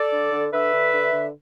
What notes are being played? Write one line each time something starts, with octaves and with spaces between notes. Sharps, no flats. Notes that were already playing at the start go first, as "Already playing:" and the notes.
Already playing: A4 D5
D3
D3
D3 B4 E5
D3
D3
D3